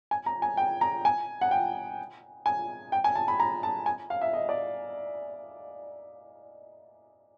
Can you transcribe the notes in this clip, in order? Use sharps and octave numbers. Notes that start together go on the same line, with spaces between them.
G#5
A#5
G#5
G5
A#5
G#5
F#5
G5
G#5
G5
G#5
A5
B5
A#5
A5
G#5
F5
E5
D#5
D5